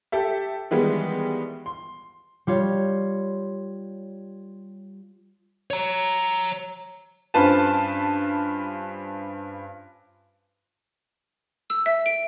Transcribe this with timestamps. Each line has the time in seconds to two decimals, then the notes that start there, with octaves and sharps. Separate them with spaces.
0.12 G4 A4 E5
0.71 D#3 E3 G3 G#3 B3
1.66 C6
2.47 G3 F4 C#5
5.70 C#5 A#5
7.34 G2 C#4 F4 B4 C5 A5
11.70 E6
11.86 E5
12.06 D7